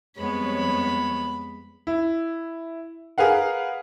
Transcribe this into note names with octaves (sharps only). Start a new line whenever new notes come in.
F2 G3 G#3 B3 C#5 B5
E4
G#4 A#4 B4 F5 F#5